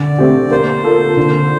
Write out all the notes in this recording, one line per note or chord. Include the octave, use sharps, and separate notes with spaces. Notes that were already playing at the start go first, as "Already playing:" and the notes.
Already playing: D3 D5
A3 C4 G4
A#3 C5
F4 A4
D3